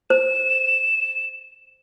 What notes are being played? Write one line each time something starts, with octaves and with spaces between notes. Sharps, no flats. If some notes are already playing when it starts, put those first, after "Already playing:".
C5 E7